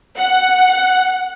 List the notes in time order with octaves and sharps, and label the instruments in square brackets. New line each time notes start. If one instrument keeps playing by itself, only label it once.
[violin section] F#5